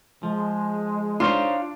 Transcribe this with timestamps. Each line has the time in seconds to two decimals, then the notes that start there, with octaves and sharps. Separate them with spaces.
0.23 F3 G#3
1.20 D4 D#4 F4 C5 C#5